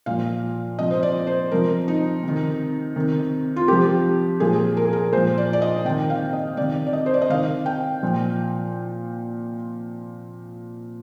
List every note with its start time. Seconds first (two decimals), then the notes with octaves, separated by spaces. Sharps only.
0.06 A#2 F3 F5
0.79 C3 F3 D#5
0.91 C5
1.03 D5
1.27 C5
1.51 C3 F3 A#4
1.88 D#4
2.23 C3
2.28 D#3
2.96 C3 D#3
3.56 F4
3.68 C3 F3 G4
4.40 A#2 F3 G#4
4.77 A#4
4.85 G#4
4.93 A#4
5.12 A#2 F3 C5
5.38 D5
5.53 D5
5.62 D#5
5.85 C3 D#3 G5
6.10 F5
6.33 D#5
6.57 C3 D#3 D5
6.87 D5
6.93 D#5
7.06 C5
7.14 D5
7.22 D#5
7.29 C3 D#3 F5
7.66 G5
8.03 A#2 F3